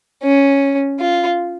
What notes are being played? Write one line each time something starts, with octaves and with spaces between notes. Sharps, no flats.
C#4
F4